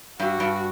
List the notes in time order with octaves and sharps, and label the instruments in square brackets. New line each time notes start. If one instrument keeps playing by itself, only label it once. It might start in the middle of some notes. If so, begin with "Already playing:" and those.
[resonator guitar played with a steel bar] G2 [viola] F#4
[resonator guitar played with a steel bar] G2